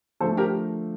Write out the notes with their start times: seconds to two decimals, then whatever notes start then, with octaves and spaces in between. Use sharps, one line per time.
0.20 D3 F3 A3 A4 C5
0.37 G4 A#4